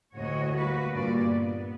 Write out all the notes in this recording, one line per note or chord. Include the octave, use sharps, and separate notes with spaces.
D2 A2 F#4 C#5 D#5
G3 A#3 F#4 B4
G2 A#2 D5
B3